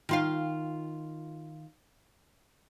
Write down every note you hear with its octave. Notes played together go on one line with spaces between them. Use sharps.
D#3 F4 F5